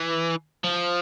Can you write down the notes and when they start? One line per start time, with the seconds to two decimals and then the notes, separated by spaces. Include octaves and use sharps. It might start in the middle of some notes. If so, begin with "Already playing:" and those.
Already playing: E3
0.64 F3